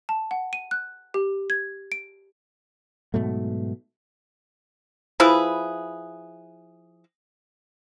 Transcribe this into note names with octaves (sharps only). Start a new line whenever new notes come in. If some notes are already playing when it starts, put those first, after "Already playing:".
A5
F#5
D#7
F#6
G4
G#6
D7
G#2 B2 F#3 A3
F3 E4 G#4 B4